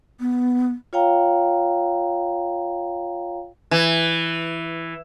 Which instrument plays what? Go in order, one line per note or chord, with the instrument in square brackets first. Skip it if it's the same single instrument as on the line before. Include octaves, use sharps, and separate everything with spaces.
[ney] B3
[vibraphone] F4 C#5 F5 G5 A#5
[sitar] E3